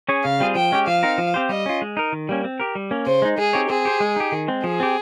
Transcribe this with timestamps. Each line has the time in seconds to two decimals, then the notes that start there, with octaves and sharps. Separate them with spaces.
0.09 C#4 G#4 C#5
0.24 C#3 F5
0.40 G3 C4 F4 G#4
0.55 F3 G5
0.72 G#3 C#4 G4
0.87 F3 F5
1.03 C4 D#4 A#4
1.18 F3
1.34 C4 G4 C5
1.49 G3 D#5
1.66 C#4 F4
1.82 G#3
1.97 D#4 A#4
2.12 D#3
2.29 G3 A#3 C#4
2.44 C4
2.60 G4 A#4
2.75 G3
2.91 A#3 C#4
3.06 C#3 C5
3.22 G#3 D#4
3.38 G#3 G#4
3.53 C4 D#4 G4 C#5
3.70 C4 G#4
3.85 G4 C5
4.00 G#3
4.16 D#4 G4
4.32 D#3
4.48 G#3 C4
4.64 F3 G#4
4.80 C4 G4